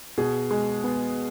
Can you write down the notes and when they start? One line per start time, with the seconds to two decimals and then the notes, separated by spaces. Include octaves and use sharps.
0.18 B2 G#4
0.51 G#3
0.84 B3